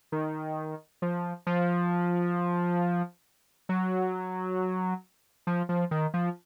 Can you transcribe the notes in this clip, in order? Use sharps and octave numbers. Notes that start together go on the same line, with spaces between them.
D#3
F3
F3
F#3
F3
F3
D#3
F3